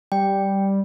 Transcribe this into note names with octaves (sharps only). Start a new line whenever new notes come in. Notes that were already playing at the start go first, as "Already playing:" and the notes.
G3 G5